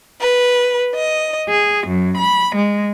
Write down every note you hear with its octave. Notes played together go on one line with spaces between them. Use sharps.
B4
D#5
G#4
F#2
B5
G#3